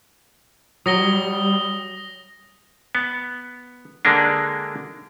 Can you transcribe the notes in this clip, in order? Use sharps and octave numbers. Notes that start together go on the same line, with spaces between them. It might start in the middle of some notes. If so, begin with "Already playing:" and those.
F#3 G3 D#6 A#6 G7
B3
D3 G#3 A#3 D4